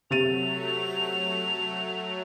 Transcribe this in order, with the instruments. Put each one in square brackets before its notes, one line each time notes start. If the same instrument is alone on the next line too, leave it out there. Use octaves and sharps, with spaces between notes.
[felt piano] C3 A6 D#7 [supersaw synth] F#3 A3 [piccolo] F7